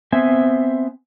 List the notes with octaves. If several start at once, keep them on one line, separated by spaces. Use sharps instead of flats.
B3 C4 C5 E5 G#5